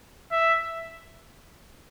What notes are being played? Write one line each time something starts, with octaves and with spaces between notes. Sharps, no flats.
E5